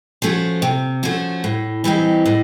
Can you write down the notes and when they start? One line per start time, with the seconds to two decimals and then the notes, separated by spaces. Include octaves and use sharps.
0.22 F3 A3 C#4 F#4
0.62 C3
1.03 F3 A3 C#4 F#4
1.44 A2
1.84 E3 G3 C4 D#4
2.26 A2